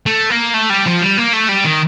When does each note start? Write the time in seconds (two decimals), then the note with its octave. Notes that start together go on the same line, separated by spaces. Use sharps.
0.06 A3
0.30 A#3
0.54 A3
0.70 G3
0.86 F3
1.02 G3
1.18 A#3
1.33 A3
1.49 G3
1.65 D#3